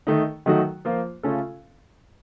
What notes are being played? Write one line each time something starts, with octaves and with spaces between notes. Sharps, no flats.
D#3 A3 D#4
D#3 F#3 A3 D#4 F#4
F3 A#3 F4 C5
C#3 A3 C#4 F4 A4